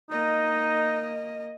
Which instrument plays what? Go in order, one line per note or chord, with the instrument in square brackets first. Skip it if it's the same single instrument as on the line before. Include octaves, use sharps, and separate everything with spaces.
[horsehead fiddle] A#3 D#5 [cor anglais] D#4